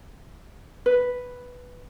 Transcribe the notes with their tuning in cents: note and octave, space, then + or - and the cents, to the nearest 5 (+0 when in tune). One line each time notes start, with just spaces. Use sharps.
B4 +0